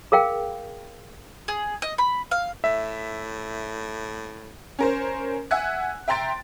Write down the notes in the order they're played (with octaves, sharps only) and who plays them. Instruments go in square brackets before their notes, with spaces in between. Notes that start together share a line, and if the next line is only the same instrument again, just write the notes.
[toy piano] G#4 A#4 F5 G5
[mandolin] G#4
D#5
B5
F5
[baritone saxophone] A2 [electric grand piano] E5
[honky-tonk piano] C#4 A#4 C5
E5 F#5 G#5 E6 F#6
E5 G5 A#5 C6 A6 D7